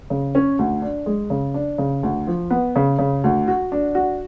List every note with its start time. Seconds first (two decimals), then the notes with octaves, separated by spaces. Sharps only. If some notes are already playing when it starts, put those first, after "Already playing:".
0.10 C#3
0.35 C#4
0.59 D2
0.82 D4
1.06 G#3
1.30 C#3
1.54 D4
1.78 C#3
2.03 D2
2.27 F3
2.50 B3
2.76 C#3
2.99 C#3
3.24 D2
3.48 F#4
3.72 D4
3.95 F#4